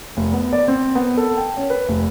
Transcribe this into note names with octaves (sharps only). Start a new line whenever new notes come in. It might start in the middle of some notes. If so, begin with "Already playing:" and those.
F1
B3
D5
C4
B3
A4
G5
C#4
B4
F1